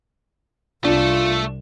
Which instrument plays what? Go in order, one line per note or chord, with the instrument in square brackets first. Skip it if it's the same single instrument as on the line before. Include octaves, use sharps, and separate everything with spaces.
[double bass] C2 [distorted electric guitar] A3 A4 [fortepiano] D4 [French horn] F4